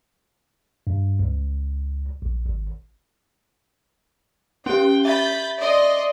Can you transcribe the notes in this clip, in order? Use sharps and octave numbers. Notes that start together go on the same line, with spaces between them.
G2
C#2
A#1
G#1
C#4 G4 G5
E5 B5 G6 A6
D5 D#5 C6